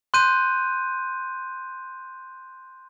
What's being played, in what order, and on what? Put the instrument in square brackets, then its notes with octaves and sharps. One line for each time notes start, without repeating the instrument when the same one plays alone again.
[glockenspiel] C6 F#6 G6 D#7